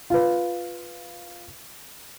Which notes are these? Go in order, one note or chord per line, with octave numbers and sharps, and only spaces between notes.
F4 B4